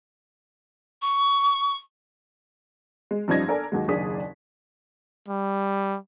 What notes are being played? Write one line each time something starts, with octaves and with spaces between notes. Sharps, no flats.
C#6
G#3
F#2 F3 G3 D#4 G#6 A#6
D4 A4 A#4 D5 G#5
D#2 F#3 G#3
F#1 D#2 D4 G#4 D#6 B6
G3